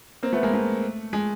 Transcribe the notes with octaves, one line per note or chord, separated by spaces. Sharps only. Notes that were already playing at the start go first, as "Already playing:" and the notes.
A#3 C4
A3 B3
G#3 A#3
A3
G#3